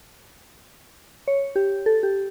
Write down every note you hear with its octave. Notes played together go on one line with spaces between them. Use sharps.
C#5
G4
A4
G4